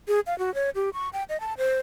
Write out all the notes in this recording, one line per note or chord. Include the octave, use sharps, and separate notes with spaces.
G#4
F5
F#4
C#5
G4
C#6
G5
D#5
A5
C5